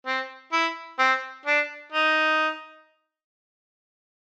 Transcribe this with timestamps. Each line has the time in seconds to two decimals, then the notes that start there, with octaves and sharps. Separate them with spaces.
0.06 C4
0.53 E4
0.99 C4
1.46 D4
1.92 D#4